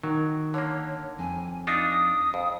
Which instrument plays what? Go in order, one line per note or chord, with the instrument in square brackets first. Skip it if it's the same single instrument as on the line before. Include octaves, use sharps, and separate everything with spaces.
[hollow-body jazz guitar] D#3 [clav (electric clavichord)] F#3
[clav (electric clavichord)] D3 A#3 [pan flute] C#5
[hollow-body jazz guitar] F2 [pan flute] G#5
[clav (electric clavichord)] D4 D#4 F4 [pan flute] D#6
[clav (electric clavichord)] F2